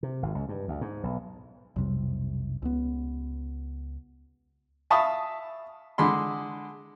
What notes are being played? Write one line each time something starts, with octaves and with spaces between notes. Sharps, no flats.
C3
G#1
C#2
G2
D2
G#2
B1
B1 F2 C3 G3
C#2 B3
E5 F5 A5 B5 C#6 D#6
D3 G#3 B5 C6